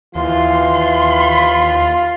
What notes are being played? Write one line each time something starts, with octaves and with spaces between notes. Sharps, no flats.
D#2 E3 F4 C6